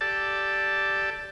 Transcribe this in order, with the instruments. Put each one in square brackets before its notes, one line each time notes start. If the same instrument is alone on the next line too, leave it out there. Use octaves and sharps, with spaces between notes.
[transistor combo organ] G4 A4 D5 A5